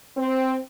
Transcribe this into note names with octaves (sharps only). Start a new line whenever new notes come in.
C4